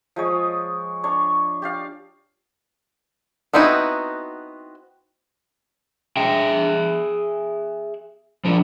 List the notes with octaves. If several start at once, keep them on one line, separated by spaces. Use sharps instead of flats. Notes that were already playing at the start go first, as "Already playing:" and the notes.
F3 G#3 C#5 D#6
D4 C#5 C#6
G4 D5 F5
B3 C4 D#4 E4 F#4
G#4 E5 G5
F3 D4